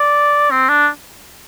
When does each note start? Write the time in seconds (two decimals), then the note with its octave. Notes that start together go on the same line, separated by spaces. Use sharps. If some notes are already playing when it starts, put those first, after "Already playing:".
Already playing: D5
0.51 C4
0.69 D4